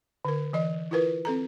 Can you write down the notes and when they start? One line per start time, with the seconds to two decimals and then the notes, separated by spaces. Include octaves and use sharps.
0.25 D3 A#4
0.53 E3 D#5
0.91 E4 F4 A#4 B4
1.25 C4 A4 A#5